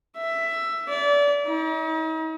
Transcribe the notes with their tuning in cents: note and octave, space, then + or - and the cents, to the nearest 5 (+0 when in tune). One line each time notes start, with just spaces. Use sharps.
E5 +10
D5 -30
D#4 +45